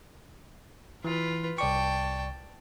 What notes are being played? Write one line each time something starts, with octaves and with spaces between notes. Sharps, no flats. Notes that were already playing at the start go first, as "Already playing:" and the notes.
E3 F4 B4
C2 D5 G5 A5 C#6